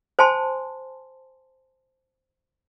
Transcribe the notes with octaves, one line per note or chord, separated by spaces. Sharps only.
C5 G#5 A5 C6